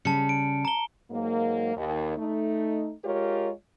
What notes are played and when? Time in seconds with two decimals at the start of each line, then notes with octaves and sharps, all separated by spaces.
0.05 C#3 G3 A5 C#7
0.29 D7
0.65 A#5 G7
1.11 G#2 F#3 G#3 A#3
1.76 D#2
2.17 A3 D#4
3.05 G#3 F4 G4 A#4 C#5